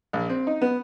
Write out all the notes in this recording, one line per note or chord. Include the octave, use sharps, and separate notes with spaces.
A#1
C4
D#4
B3